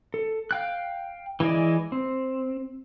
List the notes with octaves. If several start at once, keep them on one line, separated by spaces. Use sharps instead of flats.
A4
F5 G5 F#6
E3 G#3 E4 D5 D#5
C4